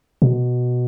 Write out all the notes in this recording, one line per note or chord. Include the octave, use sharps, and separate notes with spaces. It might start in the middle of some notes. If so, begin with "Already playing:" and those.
B2